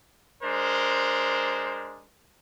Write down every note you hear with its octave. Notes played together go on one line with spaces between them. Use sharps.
G#3 D4 A#4 C5